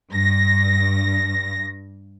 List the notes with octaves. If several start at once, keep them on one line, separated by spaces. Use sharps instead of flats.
G2 A#6